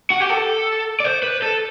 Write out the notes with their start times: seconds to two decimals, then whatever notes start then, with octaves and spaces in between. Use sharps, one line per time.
0.10 F#4
0.20 G4
0.30 A4
1.00 D5
1.04 C5
1.23 B4
1.42 A4